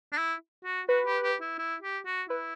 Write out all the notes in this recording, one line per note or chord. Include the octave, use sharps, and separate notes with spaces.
D4
E4
F#4
F#4 B4
G4
G4
E4
E4
G4
F#4
E4 B4